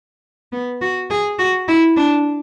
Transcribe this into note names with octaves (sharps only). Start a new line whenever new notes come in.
B3
F#4
G#4
F#4
E4
D4